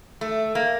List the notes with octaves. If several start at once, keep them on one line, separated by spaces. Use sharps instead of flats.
A3
A#3